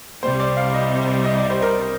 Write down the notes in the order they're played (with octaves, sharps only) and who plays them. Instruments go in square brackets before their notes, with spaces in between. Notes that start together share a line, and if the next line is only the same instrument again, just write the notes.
[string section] C2 C3 G3 [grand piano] C5
[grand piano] D5
F5
D#5
D#5
D5
C5
A#4